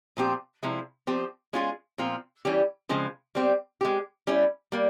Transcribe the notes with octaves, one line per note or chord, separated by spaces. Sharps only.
A#2 F3 C4 G4
C3 F3 G#3 E4
F3 C4 G4
G#3 C#4 F4 G#4
A#2 F3 C4 F4
E3 G3 C#4 G4
C#3 F3 G#3 C4
G3 C4 G4
G#3 C4 G4
G3 C#4 E4
G3 A#3